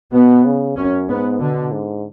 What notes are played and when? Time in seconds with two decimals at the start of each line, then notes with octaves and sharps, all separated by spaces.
0.13 B2 B3
0.45 C#3
0.77 F#2 C#4
1.08 G#2 B3
1.40 B2 D3
1.72 G#2